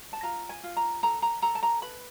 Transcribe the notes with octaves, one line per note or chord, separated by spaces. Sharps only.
A5
F4 A#5
G#5
F4
A#5
A4 A#5
A#5
A4 A#5
A5
A#5
B4 B5